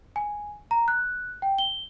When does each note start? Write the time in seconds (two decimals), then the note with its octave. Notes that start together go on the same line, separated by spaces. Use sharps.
0.16 G#5
0.71 A#5
0.88 F#6
1.42 G5
1.58 G7